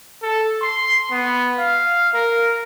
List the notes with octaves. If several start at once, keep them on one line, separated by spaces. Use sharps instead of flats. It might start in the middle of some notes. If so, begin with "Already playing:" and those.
A4
C6
B3
F5
A#4